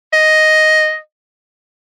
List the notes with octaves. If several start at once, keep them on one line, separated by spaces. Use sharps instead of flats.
D#5